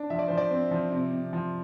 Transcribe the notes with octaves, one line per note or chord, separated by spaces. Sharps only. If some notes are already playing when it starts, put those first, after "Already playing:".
Already playing: D4
F3 E5
D5
F3 C5
D5
C4
F3
C3
C3
F3